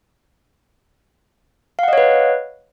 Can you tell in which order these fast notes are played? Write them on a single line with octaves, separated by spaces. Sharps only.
F5 F#5 D#5 C#5 B4